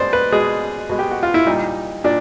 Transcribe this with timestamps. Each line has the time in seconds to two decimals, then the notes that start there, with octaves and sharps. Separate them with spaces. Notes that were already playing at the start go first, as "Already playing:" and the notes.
Already playing: B2 G#3 C5 D5
0.13 B4
0.32 B2 G#3 G#4
0.89 B2 G#3
0.99 G4
1.11 F#4
1.23 F4
1.34 E4
1.47 A#2 G3 D#4
2.04 A#2 D4